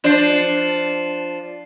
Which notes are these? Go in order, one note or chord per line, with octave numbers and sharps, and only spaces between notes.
F3 D4 C5